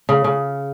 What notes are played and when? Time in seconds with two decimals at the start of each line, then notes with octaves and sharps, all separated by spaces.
0.09 C#3
0.24 C#3